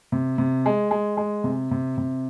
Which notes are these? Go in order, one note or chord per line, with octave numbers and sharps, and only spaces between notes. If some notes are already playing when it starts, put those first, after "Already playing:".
C3
C3
G#3
G#3
G#3
C3
C3
C3